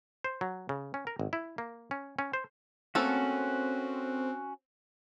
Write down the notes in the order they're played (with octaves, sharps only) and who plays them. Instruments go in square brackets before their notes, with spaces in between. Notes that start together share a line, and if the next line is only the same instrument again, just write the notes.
[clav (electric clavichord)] C5
F#3
C#3
C#4
A#4
G#1
E4
A#3
C#4
C#4
C5
[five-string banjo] A3 A#3 A4 [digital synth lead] C4 [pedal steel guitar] C#4 F#4